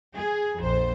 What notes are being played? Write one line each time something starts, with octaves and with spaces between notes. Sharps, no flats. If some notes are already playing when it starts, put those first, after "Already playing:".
G#4
A#1 F2 C5